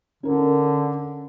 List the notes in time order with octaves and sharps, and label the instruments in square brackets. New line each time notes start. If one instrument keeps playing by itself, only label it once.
[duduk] D3 [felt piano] C#4 A#4